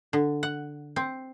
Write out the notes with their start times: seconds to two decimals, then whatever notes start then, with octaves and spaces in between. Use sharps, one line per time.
0.13 D3
0.43 F#5
0.96 C4